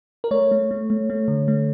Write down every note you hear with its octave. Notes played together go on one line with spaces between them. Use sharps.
A#4
A3 C#5
A3
A3
A3
A3
D3
A3